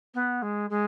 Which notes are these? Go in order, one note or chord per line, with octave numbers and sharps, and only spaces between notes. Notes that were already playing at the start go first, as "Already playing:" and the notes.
B3
G#3
G#3